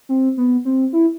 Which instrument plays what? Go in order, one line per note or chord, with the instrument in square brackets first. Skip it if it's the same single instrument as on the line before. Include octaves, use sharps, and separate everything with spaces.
[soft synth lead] C4
B3
C4
E4